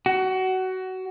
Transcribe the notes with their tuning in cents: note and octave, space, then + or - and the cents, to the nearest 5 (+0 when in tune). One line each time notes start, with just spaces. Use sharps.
F#4 +20